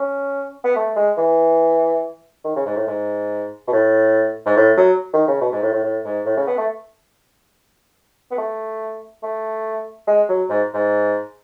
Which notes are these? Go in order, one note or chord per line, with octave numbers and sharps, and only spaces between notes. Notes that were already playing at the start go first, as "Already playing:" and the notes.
Already playing: C#4
B3
A3
G#3
E3
D#3
C#3
G#2
A2
G#2
B2
A2
G#2
A2
F#3
D#3
C#3
B2
G#2
A2
A2
A2
G#2
A2
C#3
B3
A3
B3
A3
A3
G#3
F#3
G#2
G#2